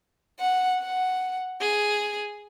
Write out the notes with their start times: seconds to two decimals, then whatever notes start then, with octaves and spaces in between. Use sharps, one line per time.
0.40 F#5
0.80 F#5
1.61 G#4